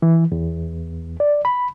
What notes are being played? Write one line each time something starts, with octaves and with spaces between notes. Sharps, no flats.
E3
E2
D5
B5